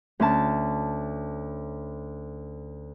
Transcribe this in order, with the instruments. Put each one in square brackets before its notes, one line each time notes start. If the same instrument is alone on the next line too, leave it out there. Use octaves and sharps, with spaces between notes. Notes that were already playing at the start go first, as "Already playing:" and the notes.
[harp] D2 C#4 A5